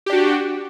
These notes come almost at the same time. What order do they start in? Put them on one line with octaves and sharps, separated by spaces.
G4 D4 F#4